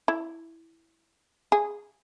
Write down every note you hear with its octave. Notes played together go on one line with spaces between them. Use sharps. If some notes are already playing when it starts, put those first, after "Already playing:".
E4
G#4